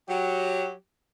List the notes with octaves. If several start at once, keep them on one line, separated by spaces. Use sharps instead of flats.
F#3 G4